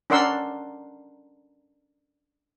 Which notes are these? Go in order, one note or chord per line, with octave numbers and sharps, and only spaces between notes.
C#4 D4 A#4 F#5 C6 E6